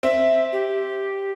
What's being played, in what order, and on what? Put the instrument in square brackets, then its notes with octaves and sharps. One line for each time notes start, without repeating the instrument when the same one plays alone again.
[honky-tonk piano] C4 [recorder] E5
[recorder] G4